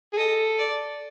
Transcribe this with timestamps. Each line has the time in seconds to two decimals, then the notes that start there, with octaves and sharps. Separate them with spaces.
0.13 G#4
0.17 A4 D#5
0.58 D5